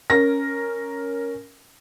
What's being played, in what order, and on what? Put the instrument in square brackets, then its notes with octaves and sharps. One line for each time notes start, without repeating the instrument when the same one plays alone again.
[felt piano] C#4 A#4 A#6